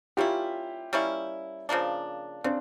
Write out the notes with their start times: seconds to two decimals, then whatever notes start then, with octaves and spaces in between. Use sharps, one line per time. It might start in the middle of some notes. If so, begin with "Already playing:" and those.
0.17 G3 A#3 C#4 E4 F4 G4
0.93 G3 A#3 C#4 E4
1.69 C#3 F3 A#3 D4
2.44 C#3 C4 D4